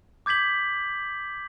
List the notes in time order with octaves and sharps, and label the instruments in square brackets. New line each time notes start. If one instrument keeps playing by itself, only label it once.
[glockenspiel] D6 G6 G#6 B6 F#7